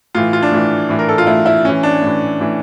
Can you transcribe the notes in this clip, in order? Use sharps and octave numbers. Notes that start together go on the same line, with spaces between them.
A2 E3 F4
F4
D4
A2 E3
A2 E3
A#4
A4
F4
A2 E3 E4
E4
A2 E3 C#4
D4
A2 E3
A2 E3